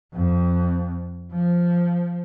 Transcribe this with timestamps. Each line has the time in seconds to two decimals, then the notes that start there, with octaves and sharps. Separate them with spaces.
0.14 F2
1.33 F3